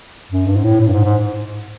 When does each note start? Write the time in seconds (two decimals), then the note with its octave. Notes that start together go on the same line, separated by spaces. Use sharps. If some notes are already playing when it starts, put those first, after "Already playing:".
0.31 F#2
0.46 G2
0.56 G#2
0.63 A2
0.80 A2
0.88 G2
0.93 G#2
1.04 G#2